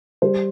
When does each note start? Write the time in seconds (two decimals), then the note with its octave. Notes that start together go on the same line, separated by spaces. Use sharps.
0.22 G3 C5